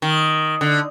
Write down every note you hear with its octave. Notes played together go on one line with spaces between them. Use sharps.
D#3
D3